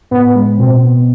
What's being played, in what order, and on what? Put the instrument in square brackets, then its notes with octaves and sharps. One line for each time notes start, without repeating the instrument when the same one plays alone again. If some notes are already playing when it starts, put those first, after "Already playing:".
[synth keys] A2 [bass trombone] B3
[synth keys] G#3
[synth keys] B2 [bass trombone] C4
[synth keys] B3